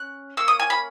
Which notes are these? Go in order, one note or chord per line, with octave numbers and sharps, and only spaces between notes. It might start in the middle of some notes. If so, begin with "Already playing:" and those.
Already playing: C#4 F#6
A#3 C#4 E6
D#6
G#5
B5